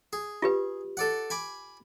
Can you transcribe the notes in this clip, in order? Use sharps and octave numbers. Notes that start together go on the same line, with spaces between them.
G#4
F4 G4 B4
A4 D5 F#5
G#5 B5 D6